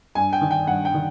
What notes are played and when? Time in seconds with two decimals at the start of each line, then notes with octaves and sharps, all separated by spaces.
0.15 G2 G#5
0.33 G5
0.41 D#3
0.51 G5
0.67 G2 F#5
0.85 G5
0.94 D#3